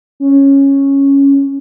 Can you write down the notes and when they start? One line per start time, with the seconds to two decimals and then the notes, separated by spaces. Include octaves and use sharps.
0.20 C#4